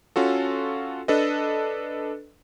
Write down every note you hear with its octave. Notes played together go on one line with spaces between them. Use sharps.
C#4 F4 F#4 A4
D4 A4 B4 D#5